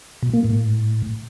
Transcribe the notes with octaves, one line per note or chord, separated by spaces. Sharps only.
B2
A#3
A2